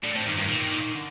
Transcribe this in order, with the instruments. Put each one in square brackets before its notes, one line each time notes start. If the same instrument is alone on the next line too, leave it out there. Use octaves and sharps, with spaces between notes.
[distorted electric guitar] A2 [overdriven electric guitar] D4
[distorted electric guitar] A2 [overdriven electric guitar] C4
[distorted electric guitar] G2 [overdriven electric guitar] D#3
[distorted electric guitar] G2 [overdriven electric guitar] D#3
[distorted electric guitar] A#2 [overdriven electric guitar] D#3
[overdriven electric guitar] D3